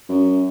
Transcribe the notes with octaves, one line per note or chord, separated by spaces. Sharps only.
F#2